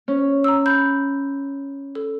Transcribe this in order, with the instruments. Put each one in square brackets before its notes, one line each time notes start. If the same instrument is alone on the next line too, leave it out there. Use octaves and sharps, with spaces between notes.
[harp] C#4
[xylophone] A#5 E6
B5 G6
A4